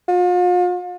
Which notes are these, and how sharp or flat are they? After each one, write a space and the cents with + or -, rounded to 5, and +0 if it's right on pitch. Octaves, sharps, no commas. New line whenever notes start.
F4 +40